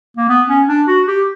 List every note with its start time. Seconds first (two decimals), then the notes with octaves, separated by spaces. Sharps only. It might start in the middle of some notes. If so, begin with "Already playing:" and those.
0.17 A#3
0.29 B3
0.49 C#4
0.68 D4
0.88 F#4
1.08 G4